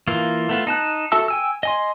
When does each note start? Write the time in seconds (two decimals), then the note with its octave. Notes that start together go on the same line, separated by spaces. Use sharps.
0.07 E3 A#3 F4
0.49 A3 B3 F4
0.67 D#4 A5 F#6
1.12 F#4 A4 E5 A5 E6
1.28 G5 G#5 E6
1.63 D#5 G#5 C6